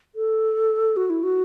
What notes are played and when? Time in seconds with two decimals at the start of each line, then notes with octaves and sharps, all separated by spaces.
0.15 A4
0.96 F#4
1.10 E4
1.23 F#4